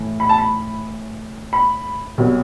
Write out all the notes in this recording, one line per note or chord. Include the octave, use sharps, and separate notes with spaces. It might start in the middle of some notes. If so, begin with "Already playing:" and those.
Already playing: A2 E3 A3
B5
A5
B5
B5
C2 B2 F#3